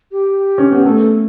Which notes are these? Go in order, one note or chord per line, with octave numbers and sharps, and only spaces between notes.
G4
C#4
B3
A3 A4